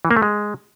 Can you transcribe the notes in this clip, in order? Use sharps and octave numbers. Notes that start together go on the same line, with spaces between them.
E3
A#3
A3
G#3